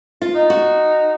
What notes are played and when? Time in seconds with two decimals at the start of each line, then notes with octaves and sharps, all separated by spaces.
0.22 F4
0.35 D#4
0.50 F#4